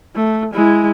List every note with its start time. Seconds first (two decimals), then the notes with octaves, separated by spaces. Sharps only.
0.15 A3
0.54 G#3 E4